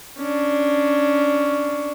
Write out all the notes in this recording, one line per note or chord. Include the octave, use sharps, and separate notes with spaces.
C#4 D4